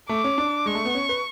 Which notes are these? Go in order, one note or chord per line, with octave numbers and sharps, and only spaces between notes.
A3 D6
C#4
D4
G#3 C#6
A3
B3
C#4
B4